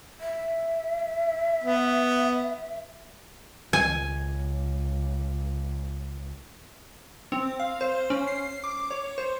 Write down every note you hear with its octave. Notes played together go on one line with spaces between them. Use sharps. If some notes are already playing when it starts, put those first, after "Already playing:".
E5
B3
C#2 G#5
C4
F5
C5
C#4
C7
D6
C#5
C5